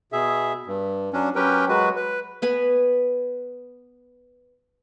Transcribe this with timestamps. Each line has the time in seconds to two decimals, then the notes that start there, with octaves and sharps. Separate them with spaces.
0.12 B2 G#4 E5
0.66 G2
1.13 F#3 C#4 D4
1.36 F#3 C#4 G4 A#4 B4 G5
1.69 F#3 G#3 F#4 B4
1.96 B4
2.42 B3 B4 G#5